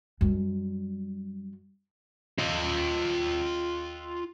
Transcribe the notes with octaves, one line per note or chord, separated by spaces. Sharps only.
F#2 G3
F4 D#5